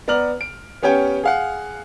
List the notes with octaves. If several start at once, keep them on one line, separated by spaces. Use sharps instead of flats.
B3 D5 A#5 F6 F#7
D7
B3 C#4 G4 C#5 G5
G#4 F5 F#5